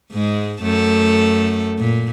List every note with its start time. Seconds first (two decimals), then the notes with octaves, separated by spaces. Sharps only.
0.12 G#2 G#3
0.62 F#2 A3 A4
1.79 A#2